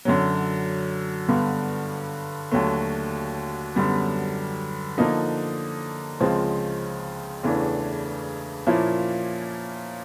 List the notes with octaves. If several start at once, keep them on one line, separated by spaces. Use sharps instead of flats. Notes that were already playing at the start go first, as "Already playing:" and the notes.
F#2 D3 F#3
G2 D3 G3 B3
D#2 D3 F#3 A3
F#2 D3 G3 B3
D3 F3 A#3 D#4
C#2 C#3 F3 G#3 C4
E2 C#3 E3 A3 D4
A#2 F3 A#3 C#4 E4